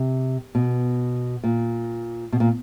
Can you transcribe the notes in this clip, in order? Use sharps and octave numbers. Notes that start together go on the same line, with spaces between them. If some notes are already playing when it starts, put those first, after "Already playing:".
Already playing: C3
B2
A#2
B2
A#2